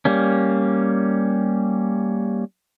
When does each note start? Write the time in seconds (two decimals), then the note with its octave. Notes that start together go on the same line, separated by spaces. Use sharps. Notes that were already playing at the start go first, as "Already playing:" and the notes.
0.05 G3 A#3 C#4